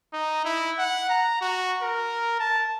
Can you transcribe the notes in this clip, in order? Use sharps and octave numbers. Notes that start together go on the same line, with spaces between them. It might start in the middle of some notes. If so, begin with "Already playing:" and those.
D#4
E4
F#5
A#5
F#4
A#4
A5